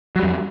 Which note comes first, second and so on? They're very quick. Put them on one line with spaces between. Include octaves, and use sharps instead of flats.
F#3 G3 F2